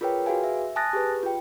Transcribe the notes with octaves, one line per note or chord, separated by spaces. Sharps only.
F4 G#4 A#4 B4 C#5 G5
F#4 G#4 B4 F5 G#5
E5
G#5 A5 D#6 F#6 A6 A#6
G4 G#4 B4
F4 G5